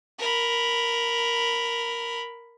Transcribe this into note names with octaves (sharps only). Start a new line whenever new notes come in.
A#4 B5